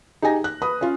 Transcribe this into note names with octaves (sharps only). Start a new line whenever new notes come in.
D#4 G4 G#4 G#5 A#6
F#6
B4 B5 D#6
C#4 F4